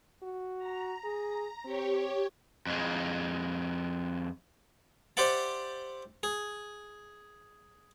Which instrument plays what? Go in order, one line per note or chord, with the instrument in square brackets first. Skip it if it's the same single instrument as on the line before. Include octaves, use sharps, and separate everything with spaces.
[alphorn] F#4
[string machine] A#5
[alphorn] G#4
[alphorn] C4 [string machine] G4 C#5
[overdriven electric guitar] F2 G#3
[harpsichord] G4 C5 D5 E5 F#5 A5
G#4